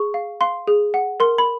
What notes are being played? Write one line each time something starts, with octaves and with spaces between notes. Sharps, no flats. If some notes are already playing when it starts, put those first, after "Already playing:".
Already playing: G#4 C#6
F5
F5 C6
G#4
F#5
A#4 C6
B5